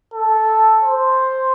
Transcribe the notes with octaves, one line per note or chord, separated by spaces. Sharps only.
A4
C5